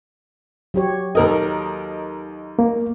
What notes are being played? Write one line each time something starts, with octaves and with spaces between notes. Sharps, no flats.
F#3 G4 C#5
D#2 A4 A#4 D#5
A#3